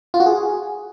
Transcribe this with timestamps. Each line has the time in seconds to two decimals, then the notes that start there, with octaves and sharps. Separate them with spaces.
0.14 F4
0.20 F#4
0.26 G#4